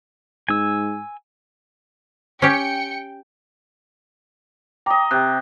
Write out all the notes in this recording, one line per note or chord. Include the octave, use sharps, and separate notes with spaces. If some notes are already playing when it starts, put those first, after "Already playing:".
G#2 G#5 E6
C#4 G4 G5 C#7
D#5 G5 A#5 D6
C3 G5 F#6